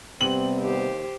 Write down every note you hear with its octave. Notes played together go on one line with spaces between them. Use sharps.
C3 G3 B3 C4 F#7
D#2 G4 C5